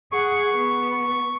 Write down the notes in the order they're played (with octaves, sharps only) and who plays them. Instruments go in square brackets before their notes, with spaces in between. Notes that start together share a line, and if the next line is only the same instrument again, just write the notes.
[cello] G#4 F#5 [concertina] C#6
[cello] B3